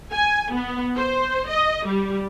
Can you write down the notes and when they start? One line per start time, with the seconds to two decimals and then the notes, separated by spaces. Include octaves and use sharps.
0.13 G#5
0.52 B3
0.95 C5
1.48 D#5
1.85 G3